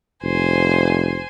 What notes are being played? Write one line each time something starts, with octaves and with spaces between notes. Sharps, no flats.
F1 C5 G#5